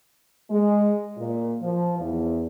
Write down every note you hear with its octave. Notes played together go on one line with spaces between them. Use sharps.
G#3
A#2
F3
E2